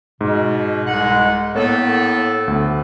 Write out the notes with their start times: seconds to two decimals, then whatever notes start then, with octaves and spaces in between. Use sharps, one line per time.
0.21 G#2 B2
0.85 C2 G#3 F#5
1.55 A2 A#3 B3 A4 C#5
2.48 D2